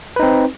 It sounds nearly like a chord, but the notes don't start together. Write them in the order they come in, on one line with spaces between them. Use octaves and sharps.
B4 D#4 C4